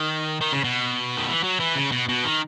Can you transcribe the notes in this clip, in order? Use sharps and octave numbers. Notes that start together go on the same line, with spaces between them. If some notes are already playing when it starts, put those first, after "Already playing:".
Already playing: D#3
D#3
C#3
B2
D#3
E3
F#3
E3
C#3
B2
B2
D#3